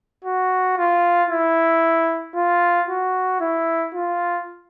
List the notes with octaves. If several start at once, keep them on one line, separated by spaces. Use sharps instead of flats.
F#4
F4
E4
F4
F#4
E4
F4